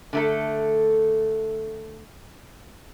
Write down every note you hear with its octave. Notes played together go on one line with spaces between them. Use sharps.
D3 A3 A4